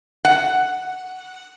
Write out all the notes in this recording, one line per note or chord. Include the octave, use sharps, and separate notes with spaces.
F#5